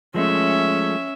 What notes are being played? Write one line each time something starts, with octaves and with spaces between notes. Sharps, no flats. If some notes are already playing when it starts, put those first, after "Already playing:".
F3 G#3 A3 C#4 E5